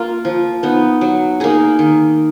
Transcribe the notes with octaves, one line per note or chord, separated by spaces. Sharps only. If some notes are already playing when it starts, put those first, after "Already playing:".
Already playing: A#3 F4
F3
B3 D#4
F#3
A#3 D#4 G#4
D#3